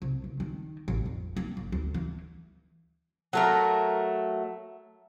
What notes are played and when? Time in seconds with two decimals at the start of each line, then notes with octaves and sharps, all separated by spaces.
0.02 C2
0.24 C#2
0.40 D#3
0.88 A1
1.06 F2
1.37 A#3
1.57 G1
1.72 D2
1.94 E3
3.33 F#3 A3 A#4